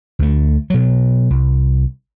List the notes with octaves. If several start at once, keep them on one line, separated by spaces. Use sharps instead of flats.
D2 A3
B2 F#3
C2